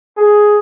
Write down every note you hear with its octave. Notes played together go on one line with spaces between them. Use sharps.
G#4